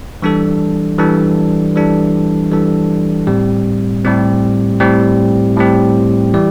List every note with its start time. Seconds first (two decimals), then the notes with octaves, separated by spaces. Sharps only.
0.22 E3 G3 D4 A4
0.98 E3 G3 D4 A4
1.75 E3 G3 D4 A4
2.51 E3 G3 D4 A4
3.27 A2 G3 C4 G4
4.05 A2 G3 C4 G4
4.80 A2 G3 C4 G4
5.57 A2 G3 C4 G4
6.34 E3 G3 E4 G4 D5